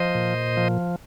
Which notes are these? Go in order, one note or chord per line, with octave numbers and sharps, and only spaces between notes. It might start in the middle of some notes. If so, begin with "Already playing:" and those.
Already playing: F3 C5 D#5
A#2
F3